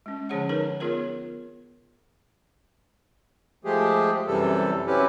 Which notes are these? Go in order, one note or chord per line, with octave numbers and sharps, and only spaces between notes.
G#3 C#4
D3 F3 C#4 G#4 C#5 F#5
D#4 A#4 B4 C#5
B3 F4 G#4 A#4 C#5
F3 G#3 A3 G4 G#4
F#2 C3 E3 G3 A4
F#3 C4 C#4 E4 G4 B4